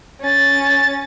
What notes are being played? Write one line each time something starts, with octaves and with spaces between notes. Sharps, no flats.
C#4 A6